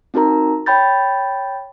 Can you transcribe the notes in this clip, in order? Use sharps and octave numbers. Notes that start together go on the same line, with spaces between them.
C4 D#4 F#4 A#4 A#5
C#5 G5 B5 G6 A6